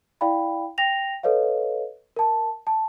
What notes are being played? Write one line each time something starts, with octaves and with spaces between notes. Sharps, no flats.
E4 D5 F5 G5 B5
G5 A#6 F7
A4 B4 C#5 D#5 F5
A#4 A5
A5